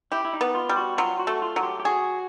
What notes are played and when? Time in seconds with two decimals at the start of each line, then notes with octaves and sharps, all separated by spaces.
0.12 E4 G4
0.25 E4
0.33 D#4
0.41 B3
0.55 F4
0.69 G3
0.77 F#4
0.98 F#3 F4
1.19 F#4
1.27 A3
1.42 F4
1.56 F#3
1.63 G4
1.80 G4
1.85 F#4 G#4